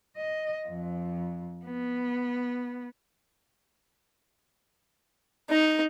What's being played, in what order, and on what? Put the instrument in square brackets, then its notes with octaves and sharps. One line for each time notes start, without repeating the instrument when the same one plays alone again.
[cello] D#5
F2
B3
[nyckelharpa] D#4